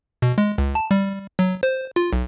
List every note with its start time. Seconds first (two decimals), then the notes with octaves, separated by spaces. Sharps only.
0.22 B2
0.38 G#3
0.58 C#2
0.75 A5
0.91 G3
1.39 F#3
1.63 C5
1.96 F4
2.13 B1